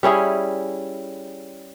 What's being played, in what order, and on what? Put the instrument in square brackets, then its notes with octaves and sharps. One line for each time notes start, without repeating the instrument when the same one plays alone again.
[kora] G3 C#4 E4 G#4